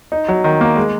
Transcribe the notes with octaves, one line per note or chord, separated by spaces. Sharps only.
D#4
F#3
D#3
A#3
G#3